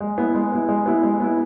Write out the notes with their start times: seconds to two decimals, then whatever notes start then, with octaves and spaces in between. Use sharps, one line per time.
0.01 G#3
0.18 B3 E4
0.35 G#3
0.52 B3 E4
0.69 G#3
0.86 B3 E4
1.03 G#3
1.20 B3 E4